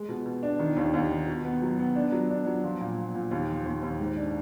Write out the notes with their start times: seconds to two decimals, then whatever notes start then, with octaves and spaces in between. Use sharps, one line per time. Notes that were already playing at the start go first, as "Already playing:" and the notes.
Already playing: G#3
0.09 B2
0.26 B2
0.43 D4
0.59 D#3
0.76 D#2
0.94 D#2
1.10 D#3
1.27 B2
1.44 B3
1.62 F#3
1.79 B3
1.96 D4
2.12 F#3
2.30 D4
2.46 F#3
2.64 F3
2.81 A#2
2.98 A#2
3.15 A#2
3.31 D#2
3.49 F3
3.66 D#2
3.83 D#2
4.00 G#2
4.17 D4